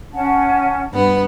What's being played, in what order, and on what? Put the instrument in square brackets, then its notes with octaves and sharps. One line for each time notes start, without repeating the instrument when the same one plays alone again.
[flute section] C#4 F#5 A5
[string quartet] G2 B3 F#5